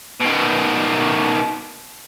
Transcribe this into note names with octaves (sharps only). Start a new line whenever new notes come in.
B2 D#3